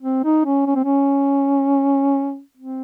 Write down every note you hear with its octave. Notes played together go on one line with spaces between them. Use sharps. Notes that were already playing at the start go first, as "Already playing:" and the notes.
C4
D#4
C#4
C#4
C4
C#4
C4